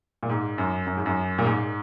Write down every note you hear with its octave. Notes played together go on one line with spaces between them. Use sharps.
A#2
G#2
F#2
F#2
G#2
F#2
A#2
G#2